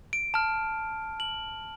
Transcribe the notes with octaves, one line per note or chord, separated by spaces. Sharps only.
D7
A5 F6
F#7